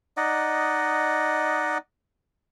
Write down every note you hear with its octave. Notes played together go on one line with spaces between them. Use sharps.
D#4 D5 D#5 F#5